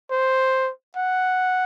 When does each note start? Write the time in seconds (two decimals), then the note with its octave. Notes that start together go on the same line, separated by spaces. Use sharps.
0.11 C5
0.97 F#5